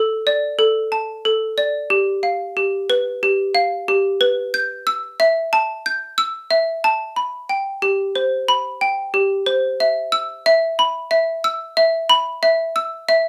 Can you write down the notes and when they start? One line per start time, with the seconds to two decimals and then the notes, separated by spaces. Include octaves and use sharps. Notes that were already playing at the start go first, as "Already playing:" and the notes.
Already playing: A4
0.27 D5
0.59 A4
0.92 A5
1.25 A4
1.58 D5
1.90 G4
2.23 F5
2.57 G4
2.90 B4
3.23 G4
3.55 F5
3.88 G4
4.21 B4
4.54 G6
4.87 E6
5.20 E5
5.53 A5
5.86 G6
6.18 E6
6.51 E5
6.84 A5
7.16 B5
7.49 G5
7.82 G4
8.15 C5
8.48 B5
8.81 G5
9.14 G4
9.46 C5
9.80 E5
10.12 E6
10.46 E5
10.79 B5
11.11 E5
11.44 E6
11.77 E5
12.09 B5
12.43 E5
12.76 E6
13.09 E5